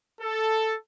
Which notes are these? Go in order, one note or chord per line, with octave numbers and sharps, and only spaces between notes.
A4